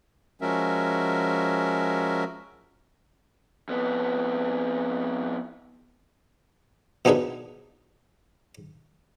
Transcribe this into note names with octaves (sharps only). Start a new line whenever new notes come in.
F3 G#3 C#4 F#4 A#4 E5
F2 B3
B2 B3 D4 D#4 G#4 B4